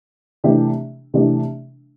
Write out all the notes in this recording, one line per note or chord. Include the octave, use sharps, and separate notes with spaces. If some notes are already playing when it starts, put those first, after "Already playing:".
C3 E3 A3 D4 G4
C3 E3 A3 D4 G4